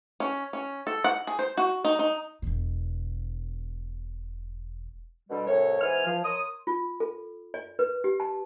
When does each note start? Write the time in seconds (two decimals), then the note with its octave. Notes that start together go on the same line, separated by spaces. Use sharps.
0.20 C#4
0.53 C#4
0.87 A4
1.04 F#5
1.27 G#4
1.39 C5
1.57 F#4
1.85 D#4
1.99 D#4
2.42 E1 B2
5.30 B2 D3 G3
5.47 C2 A2 C#5
5.81 G#2 E3 B3 C5 G#5 F6
6.05 F3
6.24 A#4 C#5 C6 D#6
6.67 F4
7.00 A4
7.54 D5
7.79 B4
8.04 G4
8.20 A5